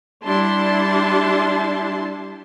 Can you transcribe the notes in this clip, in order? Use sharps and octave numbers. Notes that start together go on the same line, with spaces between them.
G3 D4 E4 A5 C6